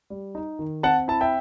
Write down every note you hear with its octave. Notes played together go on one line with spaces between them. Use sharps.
G3
D#4
D#3
C4 F#5 A5
E4 A5
E5 G5